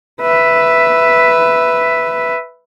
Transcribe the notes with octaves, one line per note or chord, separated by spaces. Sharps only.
B4 E5